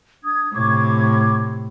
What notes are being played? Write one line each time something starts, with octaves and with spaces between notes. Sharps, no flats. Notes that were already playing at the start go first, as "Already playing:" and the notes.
D4 D#6 G#6
A2 C3 C#6 D6 G#6